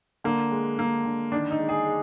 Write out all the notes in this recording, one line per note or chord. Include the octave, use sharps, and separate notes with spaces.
D3 A#3
G#3
G#3 A#3
D3
D#3 D4
D#4
G#3
G#4
G#3